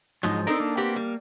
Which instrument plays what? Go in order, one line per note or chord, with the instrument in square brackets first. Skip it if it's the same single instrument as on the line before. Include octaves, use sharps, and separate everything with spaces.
[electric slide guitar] G#2 F3 F#3 [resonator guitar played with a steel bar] G#3 D#4
[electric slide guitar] C4 A#4 [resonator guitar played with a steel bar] D4 D#4 A4
[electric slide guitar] A#3
[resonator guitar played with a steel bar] B3 C4 G4
G3